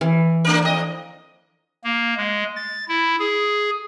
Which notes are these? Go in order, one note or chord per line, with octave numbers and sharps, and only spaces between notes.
E3
A3 D4 A#4
F2 D#5
A#3
G#3
A6
E4
G#4